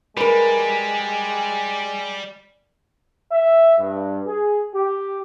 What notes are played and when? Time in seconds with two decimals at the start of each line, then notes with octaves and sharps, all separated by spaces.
0.17 G3 G#3 A#4 B4
3.31 E5
3.78 G2
4.26 G#4
4.74 G4